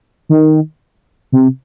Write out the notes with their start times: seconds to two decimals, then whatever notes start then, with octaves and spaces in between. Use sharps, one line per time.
0.29 D#3
1.32 C3